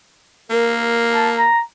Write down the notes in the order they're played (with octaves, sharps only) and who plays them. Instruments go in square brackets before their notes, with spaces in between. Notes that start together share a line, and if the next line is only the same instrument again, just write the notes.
[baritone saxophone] A#3 [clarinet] A#4
[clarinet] A5
A#5